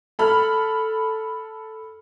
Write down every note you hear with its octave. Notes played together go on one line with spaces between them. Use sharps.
A4 B5 F6